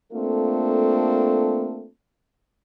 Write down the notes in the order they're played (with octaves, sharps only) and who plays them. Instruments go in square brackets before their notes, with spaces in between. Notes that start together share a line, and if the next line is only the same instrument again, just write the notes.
[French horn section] A3 A#3 C4 D4 F4 A4